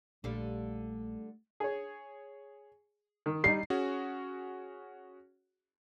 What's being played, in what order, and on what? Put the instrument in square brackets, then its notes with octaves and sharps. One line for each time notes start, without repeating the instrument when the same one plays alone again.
[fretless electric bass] A#1 A#2 [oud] D3 G3 F5 [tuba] A3
[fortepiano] G#4 C#5
D#3
[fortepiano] G3 D#4 [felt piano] C7
[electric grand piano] C#4 F#4 G#4